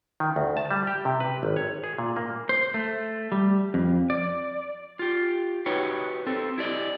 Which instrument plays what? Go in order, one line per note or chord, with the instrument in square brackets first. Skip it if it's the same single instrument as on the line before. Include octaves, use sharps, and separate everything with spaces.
[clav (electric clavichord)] D#3
D2
A5
G3
G4
C3
B4
G#1
C#5
G#4
A#2
A#3
[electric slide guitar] C5
A3
G3
F2
D5
F4 G4
D#4 F#4 G4 B4 C#5
C4 A4
E4 G4 D5 D#5